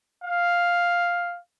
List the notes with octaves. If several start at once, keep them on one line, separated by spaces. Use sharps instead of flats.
F5